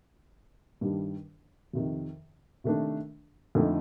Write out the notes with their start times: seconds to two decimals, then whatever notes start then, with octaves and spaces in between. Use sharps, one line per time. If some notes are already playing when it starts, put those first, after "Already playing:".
0.81 G2 D#3 G3 D4
1.73 F2 C3 D#3
2.64 C3 D#3 A3 D4
3.55 F2 D3 A3 D#4